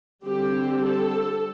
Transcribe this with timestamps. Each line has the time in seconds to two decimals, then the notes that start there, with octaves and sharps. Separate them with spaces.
0.25 D3 G3 C4 G4
0.85 A4